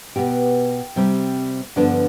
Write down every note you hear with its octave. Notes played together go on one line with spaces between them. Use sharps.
B2 B3 G4
C3 G3 C4
G2 D3 F3 B3 D4